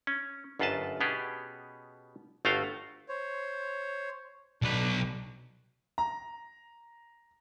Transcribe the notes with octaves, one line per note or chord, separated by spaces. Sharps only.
C#4
G1 F#2 F4 B4 D#5 A5
B2 B3 C#4 G4 G#4
G1 A3 F4 F#4 F5 G5
C5 C#5
B1 D4 B4
A#5